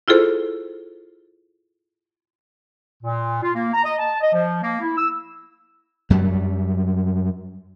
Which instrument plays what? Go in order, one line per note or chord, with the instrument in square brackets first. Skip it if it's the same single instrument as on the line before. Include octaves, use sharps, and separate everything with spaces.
[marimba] E4 F4 G#4 A4 C5
[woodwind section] A#2
F4
A#3
A#5
D#5
A5
D#5
F3
A#3
E4
E6
[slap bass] F#2 F#3 G3